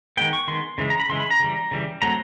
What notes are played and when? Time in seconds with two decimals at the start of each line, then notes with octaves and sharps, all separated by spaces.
0.17 D#3 G#3 B3 G5
0.33 C#6
0.48 D#3 G#3 B3 C6
0.78 C#3 E3 G#3
0.90 A#5
1.00 B5
1.09 C#3 E3 G#3 C6
1.20 B5
1.30 A#5
1.40 C#3 E3 G3
1.71 C#3 E3 G3
2.02 F#3 A3 C4 A#5